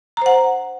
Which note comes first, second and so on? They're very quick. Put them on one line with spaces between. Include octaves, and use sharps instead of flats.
A#5 C5 F#5